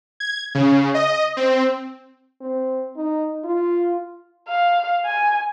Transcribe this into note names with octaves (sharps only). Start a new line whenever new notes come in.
G#6
C#3
D#5
C4
C4
D#4
F4
F5
G#5